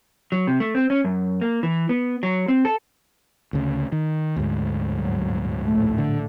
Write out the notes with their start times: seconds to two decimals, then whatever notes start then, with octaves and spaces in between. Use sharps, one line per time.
0.32 F#3
0.47 C3
0.60 A3
0.75 C4
0.90 C#4
1.04 F#2
1.41 A#3
1.63 E3
1.89 B3
2.23 F#3
2.48 C4
2.65 A4
3.53 D2 C#3
3.92 D#3
4.36 D2 G#2
4.88 G2 A#2 F#3
5.65 A#1 A2 A3
5.98 D3